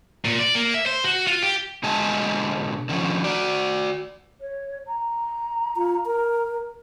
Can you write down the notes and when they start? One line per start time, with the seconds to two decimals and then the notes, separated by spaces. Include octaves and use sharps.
0.25 A#2
0.39 D5
0.55 A#3
0.74 E5
0.86 C5
1.04 F#4
1.27 F4
1.42 G4
1.83 B2 D3 G#3 D#5 G#5 A5
2.89 D3 D#3 F3 C#4
3.24 F#4 D5
4.41 C#5
4.87 A#5
5.77 F4
6.06 A#4